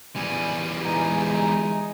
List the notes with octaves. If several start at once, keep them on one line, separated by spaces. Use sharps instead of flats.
E2 G3 G#5
E3 G#3 D#4 G#5 A#5